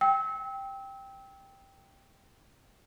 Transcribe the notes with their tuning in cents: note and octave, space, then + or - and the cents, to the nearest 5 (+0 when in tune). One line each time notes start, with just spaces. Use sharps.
G5 +0 E6 -35